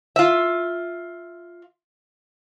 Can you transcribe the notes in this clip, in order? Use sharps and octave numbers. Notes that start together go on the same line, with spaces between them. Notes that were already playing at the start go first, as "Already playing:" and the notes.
F4 E5